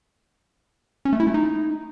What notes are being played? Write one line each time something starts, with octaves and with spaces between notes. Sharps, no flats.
C#4
A3
E4
A3
D#4